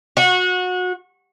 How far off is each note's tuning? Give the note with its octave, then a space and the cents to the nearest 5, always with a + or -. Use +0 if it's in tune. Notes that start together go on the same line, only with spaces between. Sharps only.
F#4 -25